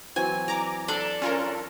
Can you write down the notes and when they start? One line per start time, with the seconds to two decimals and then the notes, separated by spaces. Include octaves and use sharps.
0.16 E3 F#3 C4 G#5
0.48 D5 A#5 D6
0.88 D4 A4 A5
1.22 C#4 F4 A#4